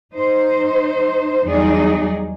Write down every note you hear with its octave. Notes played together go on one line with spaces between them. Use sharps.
D#4 C5
E2 F#3 G3 D#4 G#4 D5